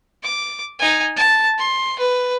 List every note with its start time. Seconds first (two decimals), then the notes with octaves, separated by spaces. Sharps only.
0.23 D6
0.79 D#4 G#5
1.16 A5
1.58 C6
1.99 B4